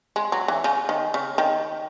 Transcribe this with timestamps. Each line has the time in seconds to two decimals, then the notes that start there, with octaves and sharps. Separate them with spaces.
0.16 G#3
0.32 F#3
0.48 E3
0.64 C#3
0.89 D#3
1.14 C#3
1.38 D#3